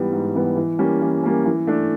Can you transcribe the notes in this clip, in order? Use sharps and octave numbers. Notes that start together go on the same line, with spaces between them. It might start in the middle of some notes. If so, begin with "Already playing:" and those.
Already playing: G#2 E3 G3 B3
G#2
E3 G3 B3
E3
G3 A#3 C#4
E3
G3 A#3 C#4
E3
A3 D4